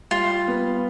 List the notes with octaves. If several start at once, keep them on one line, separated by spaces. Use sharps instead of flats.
G3 F4
B3